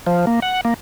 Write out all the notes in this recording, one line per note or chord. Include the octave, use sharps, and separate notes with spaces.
F3
A#3
F#5
A#3